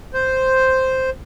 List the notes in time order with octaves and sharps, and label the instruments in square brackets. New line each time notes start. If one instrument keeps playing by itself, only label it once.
[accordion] C5